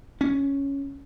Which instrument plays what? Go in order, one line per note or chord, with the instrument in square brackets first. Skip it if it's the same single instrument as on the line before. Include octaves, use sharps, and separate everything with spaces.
[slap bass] C#4